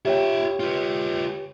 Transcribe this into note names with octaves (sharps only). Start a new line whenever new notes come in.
F4 G4 C#5 E5 G5
F4 B4